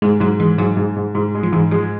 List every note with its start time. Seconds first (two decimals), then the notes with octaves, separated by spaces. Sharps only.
0.02 G#2 G#3
0.20 G#2 F#3
0.40 E3 G#3
0.58 G#2 F#3
0.77 G#2
0.96 G#2
1.15 G#2
1.35 G#3
1.43 F3
1.52 G#2 E3
1.71 F3 G#3